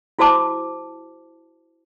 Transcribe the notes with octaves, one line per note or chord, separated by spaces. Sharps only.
E4 F#4 C5 A5 D6